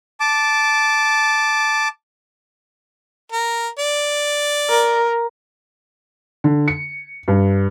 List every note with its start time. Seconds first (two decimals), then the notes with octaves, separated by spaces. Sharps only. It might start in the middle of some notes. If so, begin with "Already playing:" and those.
0.20 A5 D6
3.32 A#4
3.79 D5
4.69 A#4
6.44 D3
6.68 C#7
7.28 G2